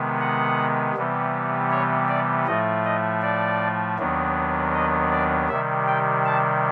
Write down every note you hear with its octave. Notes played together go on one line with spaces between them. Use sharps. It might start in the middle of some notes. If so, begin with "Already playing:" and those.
Already playing: C3 D#3 G#3 B3
F#5
C3 E3 G3 B3
C#5
D5
A2 F3 A3 D#5
D#5
D5
D#2 D#3 F#3 B3 D4
D#5
D5
C3 D#3 G3 E5
G5
A5